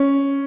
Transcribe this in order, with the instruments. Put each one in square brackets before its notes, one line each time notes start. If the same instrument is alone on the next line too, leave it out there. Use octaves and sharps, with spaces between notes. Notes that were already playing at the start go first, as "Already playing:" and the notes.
Already playing: [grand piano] C#4